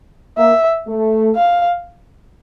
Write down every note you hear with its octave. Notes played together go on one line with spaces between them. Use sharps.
A#3 E5
A3
F5